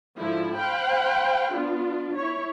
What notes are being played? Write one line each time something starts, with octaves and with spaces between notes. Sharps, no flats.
G#2 D3 F3 E4
C5 F5 G5 B5 F#6
B3 D4 F4
E4 C#5